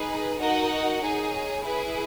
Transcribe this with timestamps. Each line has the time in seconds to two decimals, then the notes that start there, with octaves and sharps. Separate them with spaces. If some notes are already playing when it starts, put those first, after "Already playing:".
Already playing: D#4 G#4 B4
0.37 D#4 F#4 A#4 D#5 F#5
1.00 D#4 G#4 C#5
1.63 E4 G#4 B4